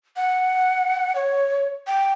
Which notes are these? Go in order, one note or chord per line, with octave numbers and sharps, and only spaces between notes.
F#5
C#5
G5